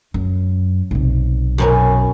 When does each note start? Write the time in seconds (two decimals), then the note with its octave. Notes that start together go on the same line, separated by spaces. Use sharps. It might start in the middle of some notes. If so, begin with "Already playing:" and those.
0.14 F#2
0.91 B1 C3
1.58 F#2 B2 C#4